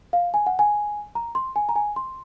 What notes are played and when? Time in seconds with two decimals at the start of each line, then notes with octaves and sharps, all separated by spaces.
0.13 F5
0.34 G#5
0.46 F#5
0.59 G#5
1.15 A#5
1.35 C6
1.56 G#5
1.69 A#5
1.76 G#5
1.96 C6